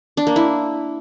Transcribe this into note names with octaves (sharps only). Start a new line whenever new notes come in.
D4
A#3
E4